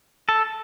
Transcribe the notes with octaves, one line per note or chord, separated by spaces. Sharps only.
A4